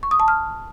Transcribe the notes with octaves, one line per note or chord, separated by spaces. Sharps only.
C#6
D#6
A5
F6